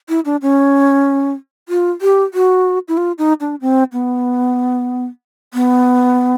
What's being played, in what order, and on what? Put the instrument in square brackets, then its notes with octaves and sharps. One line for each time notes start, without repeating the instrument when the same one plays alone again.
[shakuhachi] E4
D4
C#4
F4
G4
F#4
E4
F4
D#4
D4
C4
B3
B3